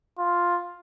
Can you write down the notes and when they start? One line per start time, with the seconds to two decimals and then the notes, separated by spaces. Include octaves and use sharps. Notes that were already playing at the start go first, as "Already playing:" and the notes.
0.19 F4